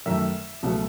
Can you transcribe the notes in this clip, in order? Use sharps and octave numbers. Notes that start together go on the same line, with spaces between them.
F#2 D#3 A3 E5
C#2 B2 F#3 A3